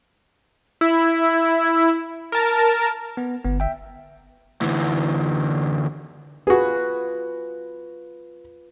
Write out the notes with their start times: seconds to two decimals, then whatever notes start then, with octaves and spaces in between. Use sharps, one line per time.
0.81 E4
2.32 A#4 A5
3.17 B3
3.45 G1 B3
3.60 E5 G5
4.62 D2 E3
6.47 F4 F#4 G#4 B4